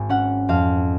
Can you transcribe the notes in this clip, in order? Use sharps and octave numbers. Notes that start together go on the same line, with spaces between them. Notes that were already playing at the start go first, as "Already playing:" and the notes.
Already playing: G#1
C#4 F#5
F2 F5